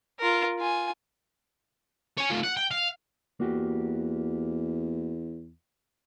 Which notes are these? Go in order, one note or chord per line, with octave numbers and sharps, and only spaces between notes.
F4 A#4
F4 G#5
C#5 G#5
A3 F4
F#5
G5
F5
E2 A#3 F#4 G4